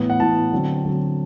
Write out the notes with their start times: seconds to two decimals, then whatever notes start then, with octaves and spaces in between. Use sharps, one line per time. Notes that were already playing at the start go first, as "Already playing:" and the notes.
Already playing: A2 E3 B3
0.10 F#5
0.20 A2 E3 B3 A5
0.52 D3 F#3 C4
0.84 D3 F#3 C4